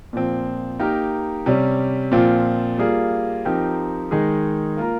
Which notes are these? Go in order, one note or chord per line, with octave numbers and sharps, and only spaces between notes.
A#2 F3 C4
A#3 D#4 G4 A#4
C3 G3 C#4
A#2 F3 C4 F4
G3 A#3 F4 G#4
F3 C4 D#4 G4 A#4
D#3 G#3 D#4 G#4
A#3 F4 A#4